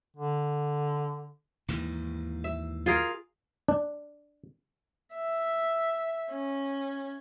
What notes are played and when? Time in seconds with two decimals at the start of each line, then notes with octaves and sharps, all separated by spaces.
0.16 D3
1.68 D#2 G#2 E3
2.44 E5
2.86 F4 G#4 A#4
3.68 D4
5.14 E5
6.30 C#4